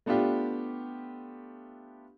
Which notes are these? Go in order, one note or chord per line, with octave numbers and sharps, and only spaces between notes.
A3 B3 D4 F4 G4